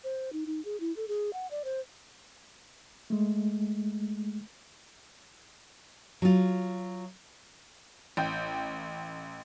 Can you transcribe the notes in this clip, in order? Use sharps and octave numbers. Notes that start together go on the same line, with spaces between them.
C5
D#4
D#4
G#4
E4
A4
G#4
F#5
D5
C5
G#3 A3
F#3 F4
A1 G5 G6